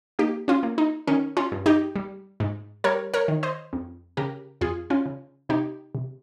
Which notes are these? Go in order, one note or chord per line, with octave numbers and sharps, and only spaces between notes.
A#3 D#4 G4
C#4 F4
A#3
D#4
D#3 C#4
C#4 F4
G2
D#4 G4
G3
G#2
G3 A#4 C#5
A#4 C#5
D#3
C5 D#5
F2
C#3 G4 A#4
F2 F4 G#4
C#4 F4
C#3
C3 D#4 G4
C3